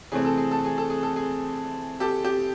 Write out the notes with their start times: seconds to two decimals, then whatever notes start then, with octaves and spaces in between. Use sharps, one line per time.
0.12 C3 E3 A3 C4 G#4
0.25 A4
0.38 G#4
0.51 A4
0.65 G#4
0.78 A4
0.90 G#4
1.03 A4
1.16 G#4
2.00 G4 A4
2.24 G4